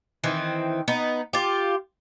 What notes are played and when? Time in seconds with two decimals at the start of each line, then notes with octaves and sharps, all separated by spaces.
0.24 D#3 E3 C4
0.88 B3 D#4
1.33 F4 G4